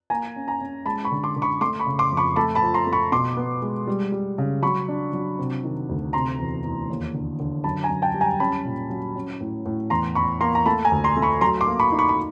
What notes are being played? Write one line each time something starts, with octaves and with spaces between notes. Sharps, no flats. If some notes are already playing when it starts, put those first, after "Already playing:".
A#3 G#5 A#5
C#4
G#5 A#5
C#4
G#3 A5 B5
B5 C#6
D3
C6 D6
D3
B5 C#6
A3 C6 D6
B5 C#6
C#3
C6 D6
F2
B5 C#6
A3 A5 B5
A5 B5
F3
A#5 C6
A3
B5 C#6
B2 C6 D6
B3
G#3
G3
G3
C#3
F#3 B5 C#6
D4
F#3
C3
D#3
D2
C3 A#5 C6
E2
E2
D#2
D3
D3
F#2 A5 B5
G#5 A#5
F#2
G5 A5
G3
G#5 A#5
C#4 A5 B5
A#2
F#3
C#4
A2
A2
E2 A#5 C6
E2 B5 C#6
A#3 A#5 C6
A#5
A3 A5 B5
G#5 A#5
D2
A#5 C6
A3
B5 C#6
F#3 A#5 C6
C6 D6
A#3
B5 C#6
D#4
B5 C#6
B5